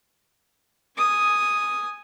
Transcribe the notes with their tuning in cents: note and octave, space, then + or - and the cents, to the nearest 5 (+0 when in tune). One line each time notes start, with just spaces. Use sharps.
G#5 +0 D#6 +0